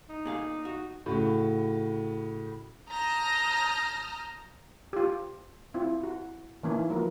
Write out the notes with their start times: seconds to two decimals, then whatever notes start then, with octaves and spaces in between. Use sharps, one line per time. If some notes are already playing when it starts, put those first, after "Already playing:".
0.10 D#4
0.26 A#2 G#4 F5
0.65 F#4
1.06 A2 C#3 F#4
2.90 A5 A#5 D#6 F6 G6 A#6
4.93 F4 G4
5.74 C4 E4 F4
6.03 F#4
6.63 E3 A#3 C#4 D#4 E4
6.90 F3 F#3 A#3 A#4 B4